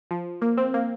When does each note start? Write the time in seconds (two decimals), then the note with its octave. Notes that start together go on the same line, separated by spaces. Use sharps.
0.11 F3
0.42 A#3
0.57 C4
0.74 A#3